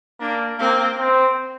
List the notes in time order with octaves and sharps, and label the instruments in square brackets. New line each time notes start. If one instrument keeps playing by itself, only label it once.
[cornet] A#3 [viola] D4
[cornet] A#3 [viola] C4
[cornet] C4